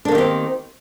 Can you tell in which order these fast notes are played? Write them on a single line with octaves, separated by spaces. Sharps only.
D4 A#3 D#3 G4 C4